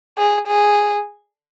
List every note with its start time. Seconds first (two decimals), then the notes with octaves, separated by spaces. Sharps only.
0.18 G#4
0.47 G#4